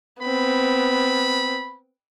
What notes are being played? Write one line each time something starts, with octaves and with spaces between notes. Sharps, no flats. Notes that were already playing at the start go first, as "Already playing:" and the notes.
B3 C4 B5